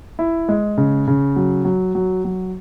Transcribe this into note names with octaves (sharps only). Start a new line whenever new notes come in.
E4
G#3
C#3
C#3
F#3
F#3
F#3
F#3